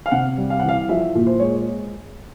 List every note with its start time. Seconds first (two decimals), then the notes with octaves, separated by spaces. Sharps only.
0.06 F5
0.11 C3 F#5
0.37 G3
0.50 F5
0.60 E3 F#5
0.69 F5
0.89 F3 E5
1.15 A#2
1.27 C5
1.40 G#3 C#5